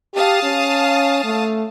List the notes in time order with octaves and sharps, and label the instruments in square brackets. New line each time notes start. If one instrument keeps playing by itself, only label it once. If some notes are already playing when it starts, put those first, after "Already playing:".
[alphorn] G4 [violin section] F5 A5 D#6
[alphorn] C#4
A3